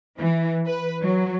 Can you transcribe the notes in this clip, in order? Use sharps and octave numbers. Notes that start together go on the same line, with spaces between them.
E3
B4
F#3